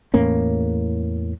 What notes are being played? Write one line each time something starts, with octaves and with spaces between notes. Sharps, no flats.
E2 A2 A#3 C#4